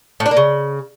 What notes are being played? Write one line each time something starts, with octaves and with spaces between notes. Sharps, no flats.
A2
D4
A#3
C#3